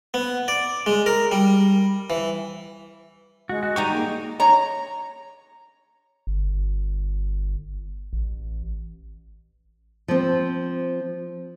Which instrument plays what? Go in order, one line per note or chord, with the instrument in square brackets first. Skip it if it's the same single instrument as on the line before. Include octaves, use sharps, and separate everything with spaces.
[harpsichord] B3
D5
G#3
A#4
G3
E3
[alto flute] G#3 [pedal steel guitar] F#4
[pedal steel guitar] F#4
[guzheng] G3 D#4 G4 [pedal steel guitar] D#5 A#5 C#6
[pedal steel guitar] A#3 [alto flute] G#4
[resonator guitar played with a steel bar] C#5 A#5
[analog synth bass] G1
A1
[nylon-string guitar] F3 C4